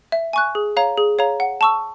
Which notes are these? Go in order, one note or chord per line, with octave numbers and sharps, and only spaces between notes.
E5
G#5 C#6 F#6
G#4
C#5 F5 A#5
G#4
C#5 F5 A#5
F#5
A5 C#6 E6